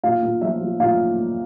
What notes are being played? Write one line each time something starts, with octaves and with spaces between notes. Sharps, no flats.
A#2 F5
A#2
F3 E5
F3
A#2 F5